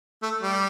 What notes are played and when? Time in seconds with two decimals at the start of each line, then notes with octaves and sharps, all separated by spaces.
0.22 A3
0.42 G3